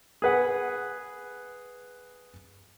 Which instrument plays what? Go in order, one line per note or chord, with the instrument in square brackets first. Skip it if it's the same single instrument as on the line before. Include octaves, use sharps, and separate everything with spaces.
[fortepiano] G#4 B4 F#5